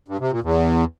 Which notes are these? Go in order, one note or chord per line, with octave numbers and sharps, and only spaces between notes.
G2
C3
A#2
E2